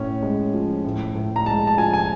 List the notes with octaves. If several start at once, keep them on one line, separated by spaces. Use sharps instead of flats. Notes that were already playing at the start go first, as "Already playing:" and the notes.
Already playing: A2 C#4
G#3
F3
A2
A2
A#5
G#3 A5
A5
F3 G#5
G#5